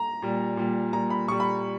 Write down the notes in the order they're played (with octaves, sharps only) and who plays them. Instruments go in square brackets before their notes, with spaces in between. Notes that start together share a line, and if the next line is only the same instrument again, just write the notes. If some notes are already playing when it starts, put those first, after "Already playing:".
Already playing: [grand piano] A#5
A#2 G3
A#2 G3
A#2 G3 A#5
B5
A#2 G3 C#6
B5